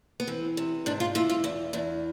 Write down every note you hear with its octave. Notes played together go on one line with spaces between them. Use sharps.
B3
E3 C4
C3
G#2 D4
F4
E3 F4
F4
E2 E4
E2 D4